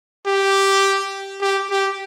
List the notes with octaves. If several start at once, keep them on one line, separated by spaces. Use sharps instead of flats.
G4
G4
G4